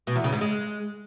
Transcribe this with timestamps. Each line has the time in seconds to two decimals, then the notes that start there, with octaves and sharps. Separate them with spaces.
0.07 B2
0.16 E2
0.24 C#3
0.33 G#2
0.41 G#3